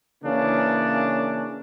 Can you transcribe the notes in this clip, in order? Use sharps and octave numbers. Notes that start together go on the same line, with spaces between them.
C#3 E3 A#3 C#4 D4